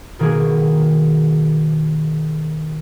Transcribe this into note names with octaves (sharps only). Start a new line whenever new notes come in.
B2 D#3 A#3 F#4 G#4